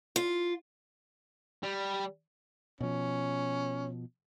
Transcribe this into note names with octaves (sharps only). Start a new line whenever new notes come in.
F4
G3
B2 F3 C#4